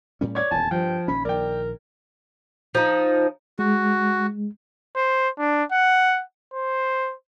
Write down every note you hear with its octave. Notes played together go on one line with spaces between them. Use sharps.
A2 G3 C#4
C#5 D5 G#6
D#1 E2 G#5 A5
G2 F3 G5
A#1 D#3 C#4 B5
A#1 D#3 A#4 D5 G5
F3 D#4
G#3 F#4
C5
D4
F#5
C5